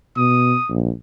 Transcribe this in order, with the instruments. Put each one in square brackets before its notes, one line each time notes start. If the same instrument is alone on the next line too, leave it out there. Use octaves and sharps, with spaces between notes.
[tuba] B2 [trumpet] D#6
[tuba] A#1